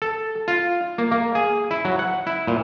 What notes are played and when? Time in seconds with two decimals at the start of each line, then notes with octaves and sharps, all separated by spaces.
0.02 A4
0.48 F4
0.98 A#3
1.12 A#3
1.35 G#4
1.71 E4
1.85 F#3
1.99 F#5
2.27 E4
2.47 A#2